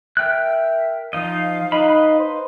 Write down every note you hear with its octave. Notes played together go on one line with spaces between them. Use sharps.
A#4 E5 G5 F#6
F3 D#4 D#5 F5
D#4 B4 D#5 B5
C5